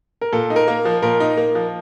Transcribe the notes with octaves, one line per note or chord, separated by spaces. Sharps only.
A#4
A#2 A4
D#4
A#4
A#3
F3
A#2 A#4
D#4
A#3
F3